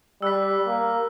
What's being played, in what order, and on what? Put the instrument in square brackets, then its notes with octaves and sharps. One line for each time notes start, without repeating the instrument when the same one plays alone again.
[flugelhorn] G3 [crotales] E6 F#6 B6
[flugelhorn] A#3